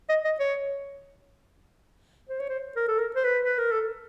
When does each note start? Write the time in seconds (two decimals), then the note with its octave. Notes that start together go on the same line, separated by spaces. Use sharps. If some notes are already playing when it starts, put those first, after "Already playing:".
0.09 D#5
0.25 D#5
0.39 C#5
2.29 C5
2.39 C#5
2.49 C5
2.76 A#4
2.88 A4
2.99 A#4
3.16 C5
3.24 B4
3.45 B4
3.58 A#4
3.72 A4